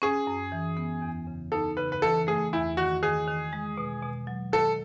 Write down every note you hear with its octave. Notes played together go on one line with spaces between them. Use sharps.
C#4 G#4
F#2
E3
B3
E2
C#3
D#4 A4
C#3 B4
B4
E3 A4
A3 G#4
E2 E4
D#3 F#4
D#3 G#4
D#3
G#3
B2
B2
F#3
D#3 A4